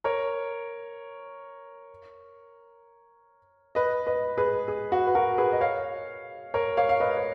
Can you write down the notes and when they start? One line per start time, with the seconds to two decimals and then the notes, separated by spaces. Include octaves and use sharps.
0.04 A#4 C#5
3.75 B4 D#5
4.07 B4 D#5
4.38 G#4 B4
4.68 G#4
4.92 F#4
5.07 B4
5.15 F#4 A#4
5.38 G#4 B4
5.52 D#5
5.61 C#5 F5
6.54 A#4 C#5
6.77 C#5 F5
6.89 F5
7.00 B4 D#5
7.17 C#5